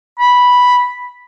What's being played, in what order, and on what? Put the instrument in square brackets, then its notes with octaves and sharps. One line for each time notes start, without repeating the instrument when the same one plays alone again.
[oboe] B5